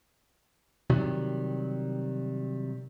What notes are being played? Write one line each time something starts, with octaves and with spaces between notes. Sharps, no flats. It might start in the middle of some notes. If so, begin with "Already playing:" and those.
C3 D#3 F#3 G3